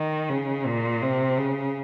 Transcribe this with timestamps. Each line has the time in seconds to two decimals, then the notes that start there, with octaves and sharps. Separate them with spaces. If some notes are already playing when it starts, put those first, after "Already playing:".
Already playing: D#3
0.30 C#3
0.66 A#2
1.02 C3
1.38 C#3